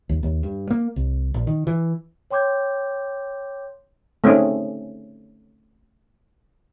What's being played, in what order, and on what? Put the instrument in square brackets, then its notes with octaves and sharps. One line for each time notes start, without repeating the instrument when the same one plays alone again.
[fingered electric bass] D#2
D#2
G2
A#3
C2
A#1
D#3
E3
[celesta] C#5 G5 C6 D6 G6 G#6
[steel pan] A3 C4 C#4 D#4 G#4